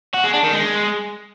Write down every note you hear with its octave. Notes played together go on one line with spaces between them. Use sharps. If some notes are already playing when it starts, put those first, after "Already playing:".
F#4
G#3
D4
D#3
G#3